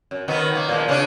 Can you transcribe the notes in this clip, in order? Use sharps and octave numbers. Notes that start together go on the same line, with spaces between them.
F#2
D#3 F#3 B3
A#3
A#2 F3 G#3
C#3 C#4 D4